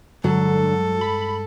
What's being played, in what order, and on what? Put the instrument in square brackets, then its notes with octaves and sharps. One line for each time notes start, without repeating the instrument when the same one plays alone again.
[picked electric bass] G2 G#3 [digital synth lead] D3 [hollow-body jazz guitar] F#3 [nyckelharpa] A4
[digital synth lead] B5